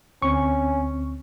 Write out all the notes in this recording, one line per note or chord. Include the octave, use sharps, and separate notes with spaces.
D2 C4 C#4 C#6